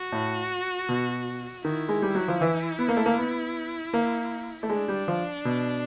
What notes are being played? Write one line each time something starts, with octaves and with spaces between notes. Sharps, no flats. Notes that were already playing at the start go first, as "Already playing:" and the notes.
Already playing: F#4
A2
B2
D#3 E4
G#3
G3
F#3
F3
E3
B3
A#3
A3
A#3
B3
A#3
A3
G#3 D4
G3
F3
B2